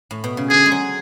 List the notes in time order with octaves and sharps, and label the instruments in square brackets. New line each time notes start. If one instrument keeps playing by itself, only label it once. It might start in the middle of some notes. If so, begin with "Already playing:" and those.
[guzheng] A2
B2
C#3
[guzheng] D3 [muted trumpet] G#4
[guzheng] G#3
F#3